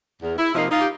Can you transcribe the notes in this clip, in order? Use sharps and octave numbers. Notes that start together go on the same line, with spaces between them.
E2
E4
C3 F3 A#3 D#4
D#4 F4
G4